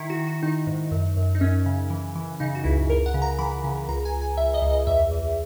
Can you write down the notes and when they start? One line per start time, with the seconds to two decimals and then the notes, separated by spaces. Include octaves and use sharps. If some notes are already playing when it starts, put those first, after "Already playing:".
Already playing: D#3 E4
0.10 F#4
0.17 D#3
0.27 F#4
0.43 D#3 D#4
0.67 G#2
0.91 F#2
1.17 F#2
1.35 D#4
1.41 F#2 C#4
1.66 C#3
1.90 E3
2.16 E3
2.40 C#3 D#4
2.55 F#4
2.64 C#2 E4
2.90 C#2 A#4
3.06 F#5
3.14 C#3
3.22 A#5
3.39 E3 B5
3.64 C#3
3.89 C#2 A#5
4.05 G#5
4.12 C#2
4.22 G#5
4.37 C#2 E5
4.54 D#5
4.62 C#2
4.70 D#5
4.87 E2 E5
5.11 E2